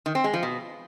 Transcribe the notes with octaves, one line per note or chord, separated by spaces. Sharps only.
D#3
C4
G#3
F3
B2